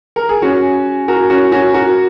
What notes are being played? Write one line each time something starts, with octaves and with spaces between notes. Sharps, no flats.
A#4
G#4
C#4 F#4
F#4 A#4
C#4 F#4
C#4 F#4
F#4 A#4